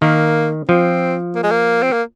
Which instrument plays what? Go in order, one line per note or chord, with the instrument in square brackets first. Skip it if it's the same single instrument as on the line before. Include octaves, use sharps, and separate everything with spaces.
[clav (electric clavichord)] D#3 [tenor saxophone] A#3
[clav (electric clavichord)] F3 [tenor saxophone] C4
[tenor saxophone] A#3
G#3
A#3
C4
A#3